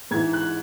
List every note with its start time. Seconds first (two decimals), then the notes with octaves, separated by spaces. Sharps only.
0.11 G#2 E3 G#6
0.33 F#6